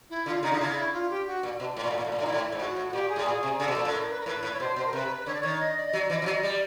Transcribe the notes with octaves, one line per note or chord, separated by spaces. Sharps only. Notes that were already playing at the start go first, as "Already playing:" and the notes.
E4
D3 F4
C#3 D#4
D3 F4
C#3 E4
E4
F4
G4
F#4
A#2
B2
A2
A#2
A2
A#2
A2
A#2
A2
D#4
A#2 E4
A2
E4
G#2
A2 F#4
A2
F#4
A#2 G4
G#4
A2
A#2 G#4
C3
C#3 A4
B2
A#2
A2
A#4
B4
A#4
A2 B4
A2
C#5
B2 C5
B2 C5
A#4
C3 B4
D3 C#5
D5
D#3 C#5
D#5
D5
D#5
F#3
D5
E3 D#5
F3 D5
F#3
D#5
G3 D5